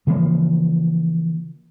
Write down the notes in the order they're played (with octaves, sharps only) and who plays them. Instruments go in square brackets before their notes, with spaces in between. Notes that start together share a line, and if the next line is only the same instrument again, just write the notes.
[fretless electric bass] C#3 E3 F3 A#3